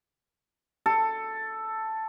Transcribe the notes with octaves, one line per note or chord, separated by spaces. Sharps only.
A4